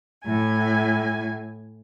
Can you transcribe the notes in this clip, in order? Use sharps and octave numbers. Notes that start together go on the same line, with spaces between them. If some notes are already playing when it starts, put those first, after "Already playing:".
A2 G#5